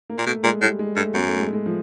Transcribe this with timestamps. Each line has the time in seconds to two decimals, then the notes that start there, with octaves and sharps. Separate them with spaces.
0.10 A#3
0.18 A#2
0.26 B2 A3
0.44 A#2 G#3
0.61 A2 G3
0.79 G#3
0.96 G2 A3
1.14 F#2 B3
1.27 A3
1.40 G#3
1.53 G#3
1.66 F3